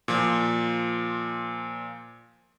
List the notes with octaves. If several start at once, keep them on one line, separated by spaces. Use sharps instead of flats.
A#2 F3